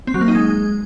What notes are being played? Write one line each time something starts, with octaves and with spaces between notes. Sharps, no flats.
C4
F#3
A#3
D#4
G#3